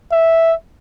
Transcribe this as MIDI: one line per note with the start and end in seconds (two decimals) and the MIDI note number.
0.12 0.53 76